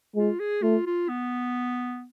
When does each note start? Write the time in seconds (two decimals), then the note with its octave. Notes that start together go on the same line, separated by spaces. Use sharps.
0.15 G#3 F4
0.40 G#4
0.62 A3 F4
0.86 F4
1.09 B3